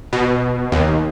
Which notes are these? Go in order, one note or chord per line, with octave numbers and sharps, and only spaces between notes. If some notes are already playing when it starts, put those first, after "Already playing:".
B2
D#2